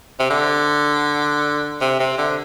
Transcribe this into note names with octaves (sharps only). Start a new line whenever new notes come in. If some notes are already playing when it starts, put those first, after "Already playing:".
C3
D3
C3
C3
D3